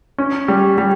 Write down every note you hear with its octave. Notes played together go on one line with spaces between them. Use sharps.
C#4
G3
G3